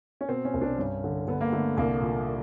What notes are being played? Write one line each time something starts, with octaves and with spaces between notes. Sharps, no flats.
C#4
B2 C4
C#4
C2
D4
G2 C#4
D3
D3 B3
A#3
D3 A3
C2 A#3
A#2